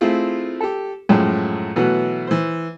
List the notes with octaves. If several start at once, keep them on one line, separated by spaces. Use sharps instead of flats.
A3 C4 E4 F4 G#4
G4 A4
F#2 A2 F3 G#3 G5
B2 E3 F#3 A3 B3
E3 C5